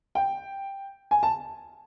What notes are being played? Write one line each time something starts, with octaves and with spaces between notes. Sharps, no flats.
G5
G#5
A5